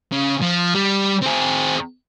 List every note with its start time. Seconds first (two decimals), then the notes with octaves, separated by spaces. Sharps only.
0.12 C#3
0.42 F3
0.75 G3
1.23 C4 G#4